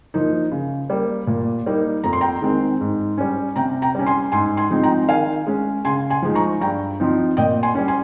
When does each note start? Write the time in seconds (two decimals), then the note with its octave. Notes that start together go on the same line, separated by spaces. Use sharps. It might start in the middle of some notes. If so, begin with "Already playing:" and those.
0.14 F3 A#3 D#4
0.51 C#3
0.90 G3 A#3
1.27 A#2
1.66 G3 A#3 D#4
2.04 F2 A#5
2.13 C6
2.21 G5 A#5
2.41 D#3 G#3 C4
2.81 G#2
3.18 G3 C#4
3.56 C3 G5 A#5
3.82 G5 A#5
3.95 G3 C#4
4.06 G#5 C6
4.32 G#2 G#5 C6
4.57 G#5 C6
4.70 F3 G#3 C4 D#4
4.83 G5 A#5
5.08 D#3 F5 G#5
5.47 G#3 C#4
5.85 C#3 G#5 C6
6.10 G#5 C6
6.22 F3 G#3 D#4
6.35 A#5 C#6
6.61 G2 G5 A#5
7.00 F3 C4 D#4
7.37 A#2 D#5 G5
7.63 G#5 C6
7.75 G3 C#4
7.88 G#5 C6